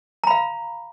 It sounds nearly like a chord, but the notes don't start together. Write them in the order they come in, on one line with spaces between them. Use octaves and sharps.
A#5 B5 F5